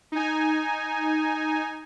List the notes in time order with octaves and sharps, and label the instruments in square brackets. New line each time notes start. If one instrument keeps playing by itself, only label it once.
[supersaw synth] D#4 G#5